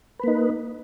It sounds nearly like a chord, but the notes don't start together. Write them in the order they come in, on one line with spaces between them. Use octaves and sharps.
B4 A#3 D#4